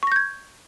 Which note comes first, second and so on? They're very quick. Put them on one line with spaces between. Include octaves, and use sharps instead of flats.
C#6 A#6 G6 G#6